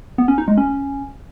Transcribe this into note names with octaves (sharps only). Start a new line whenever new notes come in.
B3
C#4
D#4
G#3
C#4